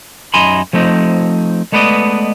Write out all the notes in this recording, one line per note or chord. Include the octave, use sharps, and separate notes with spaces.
F#2 D#4 G#5 B5 C6
F3 A3 C4 D#4
G#3 A3 B3 B4 D5 D#5